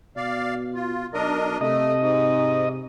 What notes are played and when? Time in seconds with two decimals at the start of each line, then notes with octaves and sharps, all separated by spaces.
0.17 B2 D5 F5
0.75 F4
1.14 B1 D4 A#4 D#5
1.61 C3 A3 D#5
2.00 G#2